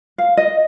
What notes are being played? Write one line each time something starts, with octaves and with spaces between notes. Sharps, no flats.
F5
D#5